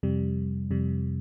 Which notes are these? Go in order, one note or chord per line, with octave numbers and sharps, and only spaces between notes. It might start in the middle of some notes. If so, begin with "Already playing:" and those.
F2 C3 G3
F2 C3 G3